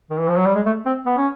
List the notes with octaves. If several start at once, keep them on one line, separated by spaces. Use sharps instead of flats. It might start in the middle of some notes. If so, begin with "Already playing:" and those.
D#3
E3
F3
F#3
G3
G#3
A3
C4
B3
C#4